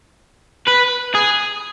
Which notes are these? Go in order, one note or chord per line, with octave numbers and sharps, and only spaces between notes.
B4
G#4